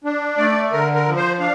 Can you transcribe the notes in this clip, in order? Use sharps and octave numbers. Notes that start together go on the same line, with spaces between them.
D4
A3 D5
D3 A#4
A#4
F3
C5
D4 F5